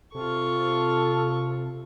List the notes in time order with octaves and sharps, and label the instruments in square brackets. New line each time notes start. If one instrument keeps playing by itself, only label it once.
[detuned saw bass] C3 [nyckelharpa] F4 C#6 [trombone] A4